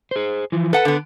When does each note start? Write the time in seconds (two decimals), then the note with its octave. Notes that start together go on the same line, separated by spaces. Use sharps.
0.11 G#4 C5
0.52 E3 F3
0.73 A4 B4 F#5 A5
0.85 D3 B3